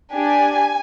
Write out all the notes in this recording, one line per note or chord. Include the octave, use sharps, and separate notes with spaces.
D4 G4 G#5